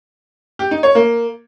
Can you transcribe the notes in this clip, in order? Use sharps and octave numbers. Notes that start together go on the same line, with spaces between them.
G4
D#4
C#5
A#3